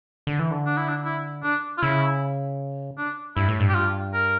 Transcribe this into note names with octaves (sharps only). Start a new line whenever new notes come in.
D3
E3
D3
D4
E4
D4
E4
D4
F4
C#3 E4
D4
G2 E4
A2
G2
G4
F4
A#4